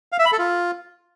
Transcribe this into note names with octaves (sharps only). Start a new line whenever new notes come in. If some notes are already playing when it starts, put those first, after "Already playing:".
F5
E5
B5
A4
F4